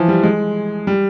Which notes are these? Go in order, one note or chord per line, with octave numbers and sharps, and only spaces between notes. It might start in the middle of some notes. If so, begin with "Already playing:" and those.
Already playing: E3 F3
G3
G#3
G3